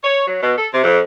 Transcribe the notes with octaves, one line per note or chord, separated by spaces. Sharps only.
C#5
F#3
B2
A4
C3
F2